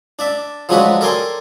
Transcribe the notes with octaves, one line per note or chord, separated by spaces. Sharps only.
D4 D5 E5
F3 F#3 G#3 D4 F#4 B4
A4 A#4 D5 G5 G#5 C6